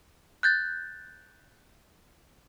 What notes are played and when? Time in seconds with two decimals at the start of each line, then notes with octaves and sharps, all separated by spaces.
0.43 F#6 G6 A6